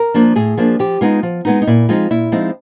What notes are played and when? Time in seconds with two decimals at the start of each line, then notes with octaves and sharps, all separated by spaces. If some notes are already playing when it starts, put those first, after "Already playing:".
Already playing: A#4
0.14 F3 A#3 D4
0.36 A2 G#4
0.57 F3 A#3 D4
0.79 F3 G4
1.01 G#3 B3 D#4 F4
1.23 F3
1.45 G#3 B3 D#4
1.62 D#4
1.67 A#2 E4
1.89 F3 G#3 C4 D#4 F4
2.10 A#2 E4
2.32 F3 G#3 C4 D#4